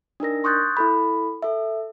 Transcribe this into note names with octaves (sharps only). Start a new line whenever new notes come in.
D4 D#4 A#4 A#6
C6 C#6 D#6 F#6 G6 A6
E4 A4 B5
A4 E5